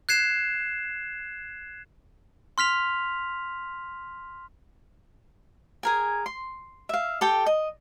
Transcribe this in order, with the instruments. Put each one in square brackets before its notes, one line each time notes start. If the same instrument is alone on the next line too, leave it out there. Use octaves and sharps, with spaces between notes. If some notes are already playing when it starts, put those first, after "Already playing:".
[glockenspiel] F#6 G#6 C7 E7
C6 F6 B6 F7
[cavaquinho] G#4 A#4 G#5
C6
E5 F5
G4 A4 G5
D#5